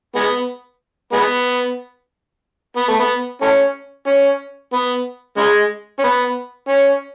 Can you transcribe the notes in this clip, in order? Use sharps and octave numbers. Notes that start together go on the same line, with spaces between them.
G#3 B3
G#3 B3
B3
A3
B3
A3 C#4
C#4
B3
C#3 G#3
C#4
B3
C#4